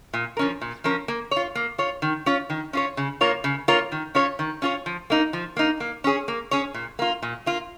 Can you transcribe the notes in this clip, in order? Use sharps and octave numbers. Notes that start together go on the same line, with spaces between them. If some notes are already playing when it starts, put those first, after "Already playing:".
A#2
F3 C#4 A#4
A#2
F3 C#4 A#4
A#3
F4 C#5
A#3
F4 C#5
D#3
C#4 F4 C#5
D#3
C#4 F4 C#5
C#3
A#3 F4 A#4 C#5
C#3
A#3 F4 A#4 C#5
D#3
C#4 F4 C#5
D#3
C#4 F4 C#5
F3
A#3 D#4
F3
A#3 D#4
A#3
C#4 G#4 C#5
A#3
C#4 G#4 C#5
A#2
A#3 F4
A#2
A#3 F4